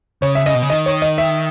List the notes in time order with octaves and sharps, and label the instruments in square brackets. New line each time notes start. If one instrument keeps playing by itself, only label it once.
[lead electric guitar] C#3 [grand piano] C#5
[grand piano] E5
[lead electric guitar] C#3 [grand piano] D#5
[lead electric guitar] B2
C#3
[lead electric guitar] D#3 [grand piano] D#5
[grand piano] C#5
D#5
E5